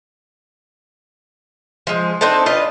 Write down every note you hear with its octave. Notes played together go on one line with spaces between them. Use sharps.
F3 G#3
C4 D4 D#4 A4
D4 F4 B4 D#5